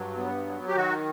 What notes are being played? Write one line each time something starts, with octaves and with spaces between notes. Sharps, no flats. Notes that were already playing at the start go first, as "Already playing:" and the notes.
Already playing: G2 F#3
B3
F#3
G4
D#3 F#4